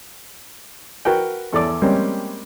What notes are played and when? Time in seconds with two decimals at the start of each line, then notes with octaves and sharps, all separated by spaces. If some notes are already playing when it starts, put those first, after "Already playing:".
1.05 F#4 A#4 B4 F#5 G5
1.53 E2 A4 D5 D6
1.82 G3 G#3 A#3 C4 C#4